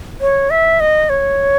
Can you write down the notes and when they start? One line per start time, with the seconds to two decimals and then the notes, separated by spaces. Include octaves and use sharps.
0.21 C#5
0.50 E5
0.80 D#5
1.10 C#5